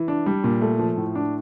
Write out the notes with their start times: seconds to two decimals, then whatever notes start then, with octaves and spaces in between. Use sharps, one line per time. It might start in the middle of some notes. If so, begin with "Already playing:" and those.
Already playing: E3
0.08 D4
0.26 G3
0.44 A#2
0.61 A3
0.79 F3
0.97 A2
1.15 D4